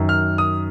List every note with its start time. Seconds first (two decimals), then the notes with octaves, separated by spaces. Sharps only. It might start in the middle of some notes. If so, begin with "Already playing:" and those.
Already playing: F#2 D#3
0.09 F6
0.38 D#6